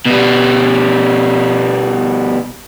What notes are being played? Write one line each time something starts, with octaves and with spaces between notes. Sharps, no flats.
B2 G3